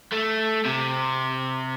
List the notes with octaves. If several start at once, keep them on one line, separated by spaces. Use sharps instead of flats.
A3
C3